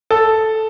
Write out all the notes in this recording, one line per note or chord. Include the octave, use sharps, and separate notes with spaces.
A4